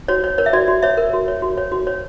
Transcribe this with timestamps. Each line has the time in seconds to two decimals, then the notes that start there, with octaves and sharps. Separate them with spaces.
0.08 F#4 C#5
0.24 C#5
0.38 A#4 C#5
0.46 E5
0.53 F#4 D5
0.68 F#4
0.83 C#5 E5
0.97 A#4
1.13 F#4
1.28 C#5
1.42 F#4
1.57 C#5
1.72 F#4
1.87 C#5